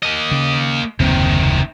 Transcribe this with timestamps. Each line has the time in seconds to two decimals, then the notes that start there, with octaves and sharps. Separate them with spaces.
0.03 A#3 D#5
0.31 C#3
1.00 F#1 D#2 C3 D#3 C4